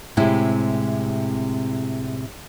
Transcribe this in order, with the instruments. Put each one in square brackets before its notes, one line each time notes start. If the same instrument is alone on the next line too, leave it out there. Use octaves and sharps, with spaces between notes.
[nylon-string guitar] A2 C3 G#3 C4 E4